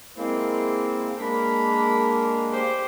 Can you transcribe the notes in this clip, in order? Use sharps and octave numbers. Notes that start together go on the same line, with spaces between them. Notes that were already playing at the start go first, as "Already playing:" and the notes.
G#3 A#3 C4 E4
G#3 A#3 D4 A#4 B5
G4 C5